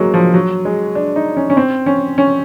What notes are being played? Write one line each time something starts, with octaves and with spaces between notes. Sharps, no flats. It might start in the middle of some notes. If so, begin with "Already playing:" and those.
Already playing: F#3 G#3 A#3
F3
F#3
G#3
D4
D#4
C#4
C#4
C4
C#4
C#4